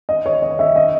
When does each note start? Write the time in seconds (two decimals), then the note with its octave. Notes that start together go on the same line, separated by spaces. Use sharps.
0.09 D#5
0.26 C#5
0.42 D#5
0.59 E5
0.76 D#5